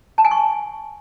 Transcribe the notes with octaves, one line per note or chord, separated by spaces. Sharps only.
A5
G#5
C#6